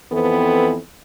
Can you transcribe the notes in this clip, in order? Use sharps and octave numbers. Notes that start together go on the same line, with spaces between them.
F2 E3 B3 C4 A4